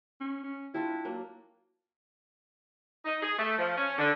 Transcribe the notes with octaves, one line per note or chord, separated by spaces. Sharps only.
C#4
C#4
G3 D4 E4 F4
F#3 A#3
D#4
G#4
A3
F3
C#4
D3